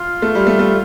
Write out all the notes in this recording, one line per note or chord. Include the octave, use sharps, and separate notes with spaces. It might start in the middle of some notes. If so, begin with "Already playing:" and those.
Already playing: F4
A3
G3
A3
A3